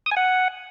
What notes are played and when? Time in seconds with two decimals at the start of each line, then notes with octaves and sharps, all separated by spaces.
0.06 D#6
0.11 G#5
0.17 F#5